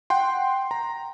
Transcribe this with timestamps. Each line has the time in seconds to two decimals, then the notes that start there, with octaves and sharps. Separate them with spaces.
0.10 F#5 G5 C6
0.71 A#5